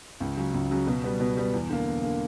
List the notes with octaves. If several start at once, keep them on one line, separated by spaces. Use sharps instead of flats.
C#2
C#3 F#3
C#2
C#3 F#3
B2
G3 B3
B2
G3 B3
E2
D3 A#3
E2
D3 A#3